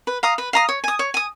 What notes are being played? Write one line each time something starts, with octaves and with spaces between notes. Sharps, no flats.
B4
F5 A#5 D#6
B4
F5 A#5 D#6
C#5
G#5 D#6
C#5
G#5 D#6